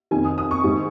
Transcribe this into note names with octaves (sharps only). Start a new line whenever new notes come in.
F2 D#3 G#5
D#6
D#6
C#6
G#2 D#3